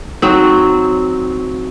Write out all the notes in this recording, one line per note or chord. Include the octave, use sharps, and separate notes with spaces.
F#3 C4 D#4